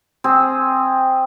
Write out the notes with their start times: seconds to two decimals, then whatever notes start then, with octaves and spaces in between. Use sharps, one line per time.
0.24 C4 G#4